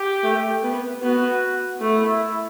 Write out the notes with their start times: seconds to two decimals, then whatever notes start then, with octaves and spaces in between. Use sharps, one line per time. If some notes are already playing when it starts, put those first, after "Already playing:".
Already playing: G4
0.24 A3
0.63 B3
1.02 B3 F#4
1.80 A3 E4